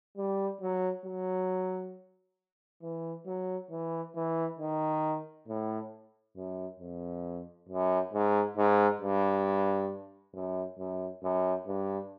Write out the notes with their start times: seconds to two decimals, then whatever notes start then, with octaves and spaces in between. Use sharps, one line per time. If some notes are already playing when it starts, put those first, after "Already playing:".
0.17 G3
0.61 F#3
1.05 F#3
2.82 E3
3.26 F#3
3.71 E3
4.15 E3
4.59 D#3
5.48 A2
6.36 F#2
6.80 F2
7.69 F#2
8.13 G#2
8.57 G#2
9.01 G2
10.34 F#2
10.78 F#2
11.23 F#2
11.67 G2